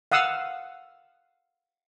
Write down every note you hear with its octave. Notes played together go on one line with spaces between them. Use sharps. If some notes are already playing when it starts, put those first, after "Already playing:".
F5 F#5 D#6 E6